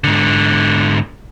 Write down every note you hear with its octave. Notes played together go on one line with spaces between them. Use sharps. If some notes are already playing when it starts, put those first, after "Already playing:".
G#2 D3